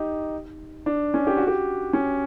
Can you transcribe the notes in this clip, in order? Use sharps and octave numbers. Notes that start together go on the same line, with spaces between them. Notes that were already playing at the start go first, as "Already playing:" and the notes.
Already playing: D#4 G4
D4
C#4
G4
F#4
G4
C#4